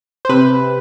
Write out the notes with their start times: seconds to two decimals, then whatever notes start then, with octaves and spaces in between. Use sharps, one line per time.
0.25 C5
0.29 C3 B4